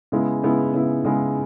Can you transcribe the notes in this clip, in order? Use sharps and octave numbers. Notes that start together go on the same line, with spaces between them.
C#3 G#3 B3 E4
C#3 G#3 B3 E4
C#3 G#3 B3 E4
C#3 G#3 B3 E4